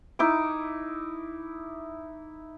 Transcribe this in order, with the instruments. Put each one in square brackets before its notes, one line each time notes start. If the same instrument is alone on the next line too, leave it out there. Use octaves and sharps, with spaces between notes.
[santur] D#4 E4 D6